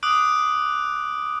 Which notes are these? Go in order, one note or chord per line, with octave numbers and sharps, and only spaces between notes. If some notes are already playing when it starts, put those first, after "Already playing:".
D6 D#6 F#6 D7